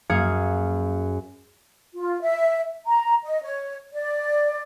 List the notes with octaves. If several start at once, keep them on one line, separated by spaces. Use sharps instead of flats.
F#2 A#3 G#4 F5 G#6 C#7
F4
E5
A#5
D#5
C#5
D5